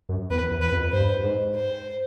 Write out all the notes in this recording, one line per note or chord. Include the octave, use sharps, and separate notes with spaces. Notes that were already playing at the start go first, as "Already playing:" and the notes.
F#2
E2 B4
E2
B4
F2
G2 C5
G#2
C5